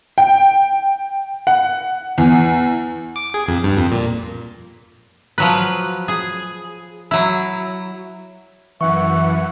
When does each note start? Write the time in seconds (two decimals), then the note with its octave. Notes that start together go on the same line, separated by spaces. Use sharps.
0.18 G5
1.47 F#5
2.18 E2
3.16 D6
3.34 G#4
3.48 F2
3.63 G2
3.77 F2
3.92 A#2
5.38 F3 F#3 B4
6.08 G#4
7.11 F#3 E4
8.81 F#2 E3 E5 F#5 C#6 C#7